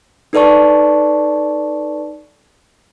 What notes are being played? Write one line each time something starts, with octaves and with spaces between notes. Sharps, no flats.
D#4 A4 B4 D5 A5 C#6